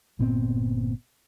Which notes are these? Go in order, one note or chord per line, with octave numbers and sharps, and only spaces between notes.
G1 A#2 B3 C4